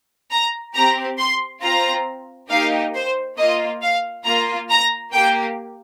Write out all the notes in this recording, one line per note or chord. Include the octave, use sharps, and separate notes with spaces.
A#5
C4 G4 A#5
C6
C4 F4 A#5
A#3 D#4 G4 F5
C5
A#3 F4 D#5
F5
A#3 F4 A#5
A#5
A#3 G4 G5